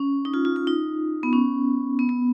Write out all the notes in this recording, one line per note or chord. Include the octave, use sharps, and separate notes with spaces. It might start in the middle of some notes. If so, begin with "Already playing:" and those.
Already playing: C#4
D#4
F4
F4
F4
D#4
B3
C#4
B3
B3